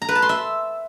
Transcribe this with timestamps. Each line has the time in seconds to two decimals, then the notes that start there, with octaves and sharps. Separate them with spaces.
0.02 A#5
0.08 B4
0.15 A5
0.22 C6
0.29 E5